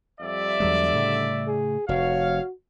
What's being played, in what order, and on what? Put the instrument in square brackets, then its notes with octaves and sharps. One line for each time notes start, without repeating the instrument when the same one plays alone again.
[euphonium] F2 [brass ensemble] G3 D5 E5
[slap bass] E2 F#3 G#3 [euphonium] D3
[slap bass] A2 C#3
[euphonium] G#4
[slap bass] F1 [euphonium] F#4 [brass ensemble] C#5 F5